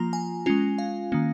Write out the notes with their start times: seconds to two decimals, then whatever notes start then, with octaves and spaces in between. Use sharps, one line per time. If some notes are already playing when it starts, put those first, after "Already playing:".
Already playing: F3 A#3 F4 A#5
0.13 G#5
0.46 G#3 C#4 F4
0.78 F5
1.12 D#3 A#3 C#4